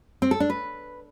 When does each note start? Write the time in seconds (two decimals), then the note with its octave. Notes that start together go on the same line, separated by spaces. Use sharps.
0.22 C4
0.31 A4
0.40 D4
0.50 B4